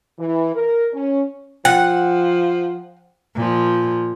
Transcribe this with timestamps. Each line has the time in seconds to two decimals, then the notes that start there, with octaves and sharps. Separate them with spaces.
0.19 E3
0.55 A#4
0.94 C#4
1.65 F3 F#5 G5
3.35 A#2 F3